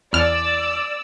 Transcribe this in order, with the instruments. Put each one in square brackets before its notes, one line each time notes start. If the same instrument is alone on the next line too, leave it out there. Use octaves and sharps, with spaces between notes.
[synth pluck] E2 F6 [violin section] D5 E6